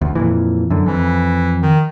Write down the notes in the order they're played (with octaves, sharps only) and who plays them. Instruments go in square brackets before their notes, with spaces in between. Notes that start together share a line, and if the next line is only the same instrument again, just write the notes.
[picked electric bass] D2
F2 A#2 E3
F#2 D3
[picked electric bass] F2 [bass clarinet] E3
[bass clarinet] D#3